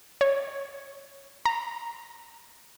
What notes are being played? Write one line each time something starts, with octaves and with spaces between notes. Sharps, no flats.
C#5
A#5